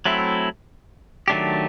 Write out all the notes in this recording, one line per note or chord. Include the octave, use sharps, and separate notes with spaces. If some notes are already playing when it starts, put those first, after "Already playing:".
F#3 A3 C4 E4
D#3 F#3 A3 D4 G4